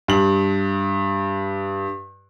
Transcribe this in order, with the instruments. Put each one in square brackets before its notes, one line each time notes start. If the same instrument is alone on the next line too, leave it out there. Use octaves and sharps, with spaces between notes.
[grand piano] G2 F#7